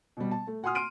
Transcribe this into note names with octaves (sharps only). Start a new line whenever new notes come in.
B2 G3
A5
A3
F#4 F#5 G#5 C6 D#6 F6
C6 F6 D7 D#7